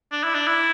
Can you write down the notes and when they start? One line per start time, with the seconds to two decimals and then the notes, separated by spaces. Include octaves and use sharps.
0.12 D4
0.23 E4
0.35 D4
0.47 E4